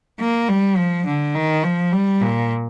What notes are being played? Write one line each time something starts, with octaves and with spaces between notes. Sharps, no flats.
A#3
G3
F3
D3
D#3
F3
G3
A#2